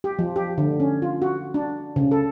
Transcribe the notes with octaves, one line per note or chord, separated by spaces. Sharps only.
G4
F3
G4
D3
C#4
F4
F#4
D4
C#3
A4